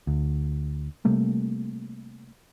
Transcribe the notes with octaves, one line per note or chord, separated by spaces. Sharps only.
D2
C3 G3 A3 A#3